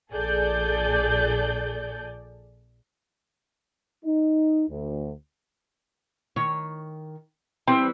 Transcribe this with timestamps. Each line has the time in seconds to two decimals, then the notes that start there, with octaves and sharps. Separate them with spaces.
0.11 A#1 G#4 A4 D5 G6
4.05 D#4
4.69 D2
6.36 D#3 C#5
7.67 E3 G3 C4